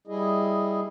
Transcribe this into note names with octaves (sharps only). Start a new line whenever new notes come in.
G3 E4 G#4 D#5